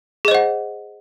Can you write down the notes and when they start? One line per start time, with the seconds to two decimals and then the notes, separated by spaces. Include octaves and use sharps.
0.25 G#4
0.28 D#5
0.31 C5
0.35 F#5